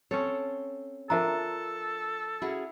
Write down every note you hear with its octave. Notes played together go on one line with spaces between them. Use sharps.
C4 C#4 A4 C#5
F3 D4 A4 A#4 E5 A#5
C#4 E4 F#4 G#4